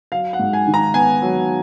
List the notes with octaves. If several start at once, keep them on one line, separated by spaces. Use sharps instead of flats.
F#3 F5
F#5
G#2
G#5
D#3
A#5
B3 G#5
F#3